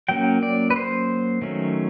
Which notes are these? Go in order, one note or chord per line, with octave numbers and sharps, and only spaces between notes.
F#3 A#3 C#4 G5
D5
B4
C5
D#3 F#3 A3 C#4